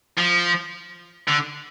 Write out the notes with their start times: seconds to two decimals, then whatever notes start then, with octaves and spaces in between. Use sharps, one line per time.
0.18 F3
1.28 D3